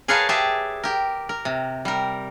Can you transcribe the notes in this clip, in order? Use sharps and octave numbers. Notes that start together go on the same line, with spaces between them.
G#4 A#4 B4 C#5 F5 A5
G4 G#4 E5 A5
G4 A#4
A#4
C3
G3 A#4